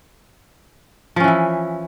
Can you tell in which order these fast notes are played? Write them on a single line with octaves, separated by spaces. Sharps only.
F3 C#4 E3 E4